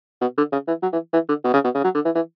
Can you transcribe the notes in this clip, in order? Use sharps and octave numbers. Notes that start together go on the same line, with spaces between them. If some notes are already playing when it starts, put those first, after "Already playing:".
B2
D3
C#3
E3
F#3
E3
E3
D3
B2
C#3
B2
C#3
F#3
D3
E3
E3